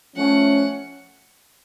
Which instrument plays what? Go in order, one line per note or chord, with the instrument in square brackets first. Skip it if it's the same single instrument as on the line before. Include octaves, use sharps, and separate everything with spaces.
[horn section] F3 A3 C#4 [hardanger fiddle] F#5